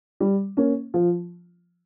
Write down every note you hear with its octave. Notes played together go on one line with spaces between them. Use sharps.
G3
A#3 C#4
F3